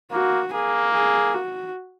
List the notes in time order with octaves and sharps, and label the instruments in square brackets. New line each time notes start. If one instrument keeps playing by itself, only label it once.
[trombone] A#3 [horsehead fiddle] F#4
[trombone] A#3 [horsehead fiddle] G#4
[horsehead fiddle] G#4
F#4